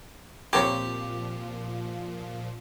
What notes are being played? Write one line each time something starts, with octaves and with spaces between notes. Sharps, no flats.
A#2 F3 A#3 C4 G4 C#5